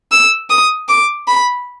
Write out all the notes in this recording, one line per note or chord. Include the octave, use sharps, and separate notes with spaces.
E6
D#6
D6
B5